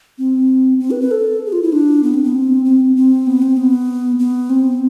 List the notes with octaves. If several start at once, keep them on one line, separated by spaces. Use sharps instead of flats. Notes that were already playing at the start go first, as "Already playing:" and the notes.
C4
C4
B4
B4
A4
G#4
F4
E4
D4
B3
C4
B3
C4
C4
C4
B3
C4
B3
B3
C4